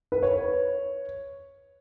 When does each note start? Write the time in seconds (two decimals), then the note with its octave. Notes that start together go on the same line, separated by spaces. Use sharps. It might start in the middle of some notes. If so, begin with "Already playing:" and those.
0.12 B4
0.23 C#5